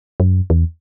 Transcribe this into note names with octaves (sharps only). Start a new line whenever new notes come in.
F#2
E2